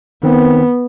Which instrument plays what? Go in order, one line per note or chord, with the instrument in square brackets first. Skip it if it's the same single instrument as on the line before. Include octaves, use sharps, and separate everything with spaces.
[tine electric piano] D#3 C4 [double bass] B3